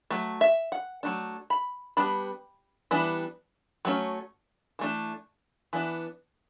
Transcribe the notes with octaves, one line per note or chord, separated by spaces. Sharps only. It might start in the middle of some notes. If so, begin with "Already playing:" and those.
F#3 A3
E5
F#5
F#3 A3 D4
B5
G3 B3 D4 B5
E3 G3 B3 D4
F#3 A3 C#4
E3 A3 D4
E3 B3 D4